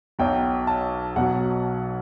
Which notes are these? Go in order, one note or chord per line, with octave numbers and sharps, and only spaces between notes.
B1 B2 F#3 G5
A5
B1 B2 F#3 F#5